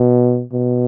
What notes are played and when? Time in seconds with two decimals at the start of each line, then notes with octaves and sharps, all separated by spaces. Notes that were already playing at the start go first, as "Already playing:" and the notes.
Already playing: B2
0.53 B2